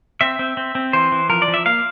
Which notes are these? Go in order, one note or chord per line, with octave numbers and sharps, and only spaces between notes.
C4 E5
C4
C4
C4
E3 C5
E3
F3 A#4
D5
F3
E5
A#3 F5